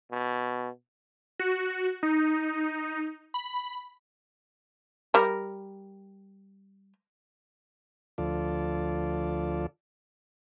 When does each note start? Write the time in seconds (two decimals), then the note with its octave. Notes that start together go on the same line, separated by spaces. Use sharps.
0.11 B2
1.39 F#4
2.03 D#4
3.34 B5
5.14 G3 A#4
8.18 D2 F3 F4 A4 D5